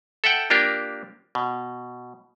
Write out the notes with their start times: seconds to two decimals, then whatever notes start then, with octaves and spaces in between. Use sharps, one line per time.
0.24 A4 E5 F#5 G5
0.50 A#3 D4 F4 G4 A#4
1.35 B2